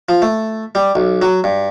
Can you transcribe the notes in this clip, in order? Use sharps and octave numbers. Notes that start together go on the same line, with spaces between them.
F3
A3
G3
B1
F#3
G2